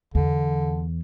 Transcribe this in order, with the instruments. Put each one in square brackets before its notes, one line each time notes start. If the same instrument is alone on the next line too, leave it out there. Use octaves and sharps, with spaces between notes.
[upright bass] E2 [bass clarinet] D3